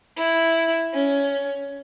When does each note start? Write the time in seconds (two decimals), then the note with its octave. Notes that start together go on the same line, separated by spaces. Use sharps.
0.17 E4
0.93 C#4